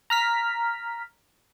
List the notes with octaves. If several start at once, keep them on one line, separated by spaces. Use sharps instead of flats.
A#5 F6 B6